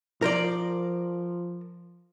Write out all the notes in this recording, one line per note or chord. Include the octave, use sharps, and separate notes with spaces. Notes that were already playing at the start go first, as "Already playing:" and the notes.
F3 A#4 C5 D5